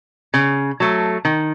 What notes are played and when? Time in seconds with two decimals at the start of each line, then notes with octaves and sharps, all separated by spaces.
0.34 C#3
0.80 F#3 A3
1.25 D#3